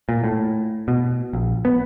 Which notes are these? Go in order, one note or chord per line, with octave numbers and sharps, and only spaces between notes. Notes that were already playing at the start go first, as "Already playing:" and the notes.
A#2
A2
B2
A#1
B3